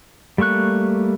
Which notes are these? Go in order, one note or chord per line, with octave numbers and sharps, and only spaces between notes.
G3 A3 A#3 C#6 F#6